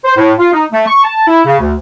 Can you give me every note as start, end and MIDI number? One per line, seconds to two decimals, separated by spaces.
0.04 0.16 72
0.17 0.32 45
0.38 0.50 65
0.53 0.64 63
0.71 0.84 57
0.87 1.00 85
1.03 1.23 81
1.27 1.40 64
1.45 1.55 49
1.60 1.74 38